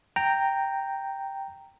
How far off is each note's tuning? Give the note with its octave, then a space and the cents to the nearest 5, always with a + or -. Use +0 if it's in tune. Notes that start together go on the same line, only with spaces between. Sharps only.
G5 +0 A#5 -10